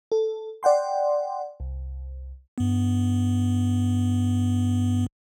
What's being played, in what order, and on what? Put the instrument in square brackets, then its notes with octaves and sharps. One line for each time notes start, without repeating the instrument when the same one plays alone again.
[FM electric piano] A4
D5 F#5 G5 C6
C2
[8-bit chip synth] G2 B3